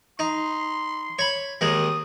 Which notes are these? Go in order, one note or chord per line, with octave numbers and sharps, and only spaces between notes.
D#4 C6
C#5 B5
D#2 D#3 G#3 D#6